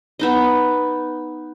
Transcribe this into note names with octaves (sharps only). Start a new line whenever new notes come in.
B3 D#4 D#5